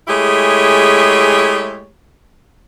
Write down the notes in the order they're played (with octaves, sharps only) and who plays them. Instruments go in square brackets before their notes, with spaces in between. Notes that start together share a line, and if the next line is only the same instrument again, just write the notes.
[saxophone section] G#3 A3 E4 G4 G#4 C#5